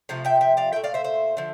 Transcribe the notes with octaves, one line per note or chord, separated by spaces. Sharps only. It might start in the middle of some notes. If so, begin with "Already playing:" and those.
C3 F3 A3
E5 G5
E5 G5
D5 F5
A#2 A3 E5 G5
D5 F5
C5 E5
C5 E5
D3 F3